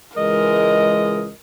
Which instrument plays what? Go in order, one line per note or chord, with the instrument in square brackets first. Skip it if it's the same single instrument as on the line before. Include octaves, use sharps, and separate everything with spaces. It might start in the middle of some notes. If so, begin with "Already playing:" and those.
[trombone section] C#2 E3 G#3 [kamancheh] A#4 [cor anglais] D#5